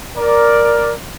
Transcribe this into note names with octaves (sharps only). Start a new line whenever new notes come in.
A#4 D5